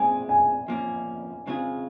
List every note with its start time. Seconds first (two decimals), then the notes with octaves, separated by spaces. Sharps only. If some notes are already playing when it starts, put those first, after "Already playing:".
Already playing: A#2 G#3 C4 G#5
0.29 G#5
0.68 F3 A#3 C#4
1.47 C#3 G#3 C4 F4 G#4